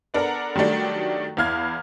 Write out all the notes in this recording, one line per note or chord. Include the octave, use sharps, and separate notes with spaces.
B3 D4 A4 A#4 F#5 A#5
D#3 F#3 G3 A3 D4
E2 E4 F5 F6 G#6